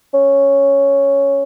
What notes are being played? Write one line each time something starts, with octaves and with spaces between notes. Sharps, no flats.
C#4